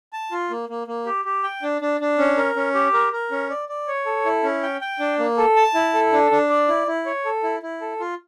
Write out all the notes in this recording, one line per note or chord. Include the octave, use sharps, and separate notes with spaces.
A5
F4
A#3
A#3
A#3
G4
G4
G5
D4
D4
D4
C#4
A#4
C#4
G4
A#4
A#4
C#4
D5
D5
C#5
A4
E4
C#4
G5
G5
D4
A#3
A4
A5
E4
A4
D4
D4
D5
E4
E4
C#5
A4
E4
E4
A4
F4